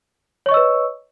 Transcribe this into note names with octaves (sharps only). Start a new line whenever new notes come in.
B4 C#5 D#5 C#6 E6